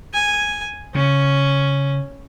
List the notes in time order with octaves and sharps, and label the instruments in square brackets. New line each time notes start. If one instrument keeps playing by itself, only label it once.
[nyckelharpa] G#5
[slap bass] C#3 [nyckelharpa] C#4